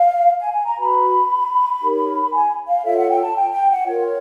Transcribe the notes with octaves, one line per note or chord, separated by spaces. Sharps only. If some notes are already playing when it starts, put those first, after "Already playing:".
Already playing: F5
G#5
G#5
A#5
F#4 B4 B5
D#4 G4 A#4 C#5
G#5
F5
F4 A4 C#5 E5
F#5
G5
A5
G5
G5
F#5
F4 A#4 C#5